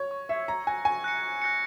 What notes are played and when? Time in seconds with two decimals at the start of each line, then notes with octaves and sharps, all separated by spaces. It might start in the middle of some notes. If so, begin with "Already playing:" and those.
Already playing: C#5
0.11 C#6
0.29 E5 E6 G#6 C#7
0.48 A#5 C#6
0.67 G#5 F#6 A#6 C#7
0.85 G#5 C#6
1.04 F#6 A#6 C#7
1.23 C#6
1.42 F#6 A#6 C#7